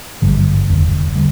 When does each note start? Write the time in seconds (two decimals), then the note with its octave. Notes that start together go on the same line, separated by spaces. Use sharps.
0.22 G#1 G2 D3 G3
0.69 F1 D#2 D3
1.15 D3 G3